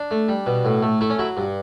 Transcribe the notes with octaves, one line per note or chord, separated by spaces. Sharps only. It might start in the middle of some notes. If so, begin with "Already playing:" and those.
Already playing: D4
A3
G3
B2
A2
A3
A3 E4
C#4
F#3 E4
G2